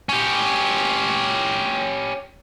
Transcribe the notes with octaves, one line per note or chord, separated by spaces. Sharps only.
C#4 G4